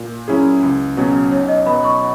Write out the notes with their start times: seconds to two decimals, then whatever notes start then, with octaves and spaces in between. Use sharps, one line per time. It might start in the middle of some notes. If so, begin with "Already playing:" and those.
Already playing: A#2
0.28 F#3 C#4 E4 G#4
0.63 C#2
0.97 B2 F#3 C#4
1.31 B1 C#5
1.49 D#5
1.66 B2 F#3 B3 B5
1.84 C#6